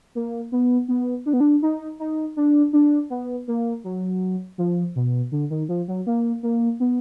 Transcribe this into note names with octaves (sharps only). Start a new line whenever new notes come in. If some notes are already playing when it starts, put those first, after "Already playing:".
A#3
B3
B3
D4
B3
D4
D#4
D#4
D4
D4
B3
A#3
F#3
F3
B2
D3
D#3
F3
F#3
A#3
A#3
B3